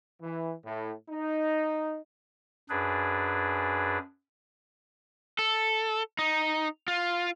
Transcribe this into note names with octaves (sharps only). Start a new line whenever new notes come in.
E3
A2
D#4
F#2 D4 G#4 B4
A4
D#4
F4